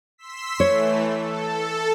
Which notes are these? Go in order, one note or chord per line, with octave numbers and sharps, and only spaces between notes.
C6 E6 B6
E3 A3 C#5
A4